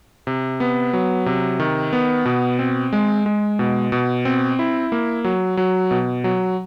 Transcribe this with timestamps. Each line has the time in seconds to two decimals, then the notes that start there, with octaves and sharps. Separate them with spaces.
0.27 C3
0.60 B3
0.93 F#3
1.26 C3
1.60 D#3
1.93 B3
2.25 B2
2.59 C4
2.93 G#3
3.26 G#3
3.59 B2
3.92 B2
4.25 C4
4.59 E4
4.92 A#3
5.24 F#3
5.57 F#3
5.91 B2
6.24 F#3